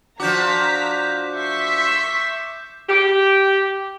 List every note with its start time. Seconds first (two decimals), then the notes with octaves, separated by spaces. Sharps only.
0.20 F3 D4 F#4 A#5 D6 G6 B6
1.37 E5 C6 C#6 B6
2.89 G4